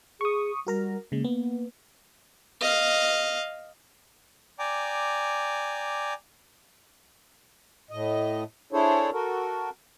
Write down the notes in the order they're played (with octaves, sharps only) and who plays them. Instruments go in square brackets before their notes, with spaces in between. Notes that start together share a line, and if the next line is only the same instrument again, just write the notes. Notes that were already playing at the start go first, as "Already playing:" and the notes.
[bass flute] G#4 [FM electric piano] C#6 D#6
[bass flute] G3 [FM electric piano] F#4 A#4 A#5
[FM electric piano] C#3 G#3 [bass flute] A#3
[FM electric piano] B3
[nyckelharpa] D#5 F5
[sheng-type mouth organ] D5 G5 G#5 A#5 D6
[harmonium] A2 D#5
D4 E4 G#4 A4 C5 C#5
F#4 A4 A#4